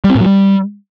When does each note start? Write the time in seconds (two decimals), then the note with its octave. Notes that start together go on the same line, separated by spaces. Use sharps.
0.04 G3
0.10 C4
0.15 A2
0.21 F#3
0.26 G3